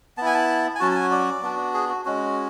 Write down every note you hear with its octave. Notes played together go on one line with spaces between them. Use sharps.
B3 E4 G#5 A5
A5
G#5
F#3 C#4 F#4 A5
A5
G#5
D5
B3 D4 F#4
G#4
F#4
G#3 C#4 F#4